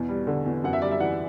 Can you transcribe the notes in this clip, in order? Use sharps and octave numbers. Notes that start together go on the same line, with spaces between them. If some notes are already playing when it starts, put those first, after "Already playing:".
Already playing: E2 B2
G3
D3
E2
F#2 F#5
E5
G3 D5
E5
E3 F#5